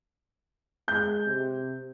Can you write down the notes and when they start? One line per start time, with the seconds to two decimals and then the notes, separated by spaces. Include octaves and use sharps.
0.88 G#3 G6
1.26 C3